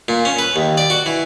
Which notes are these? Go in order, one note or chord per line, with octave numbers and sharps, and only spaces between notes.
A#2
C#4
B4
D#2
D5
F#4
E3